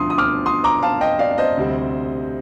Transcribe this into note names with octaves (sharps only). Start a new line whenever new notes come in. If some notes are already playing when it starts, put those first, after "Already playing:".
Already playing: D2 D3 F3 C6 D#6
D#6
D6 F6
C6 D#6
A#5 D6
F5 A5
D#5 G5
D5 F5
F5
C5 D#5
D2 C3 G3 C4